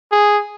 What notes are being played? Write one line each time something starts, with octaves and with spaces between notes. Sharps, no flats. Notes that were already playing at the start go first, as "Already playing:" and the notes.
G#4